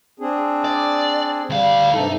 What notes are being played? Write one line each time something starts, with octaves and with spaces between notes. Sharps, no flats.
C4 D4 G#4
D5
D2 G3 F5
G2 C3 D#4 A4